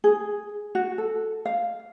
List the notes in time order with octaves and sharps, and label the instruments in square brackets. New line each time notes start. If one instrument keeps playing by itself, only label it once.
[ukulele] G#4
F#4
A4
F5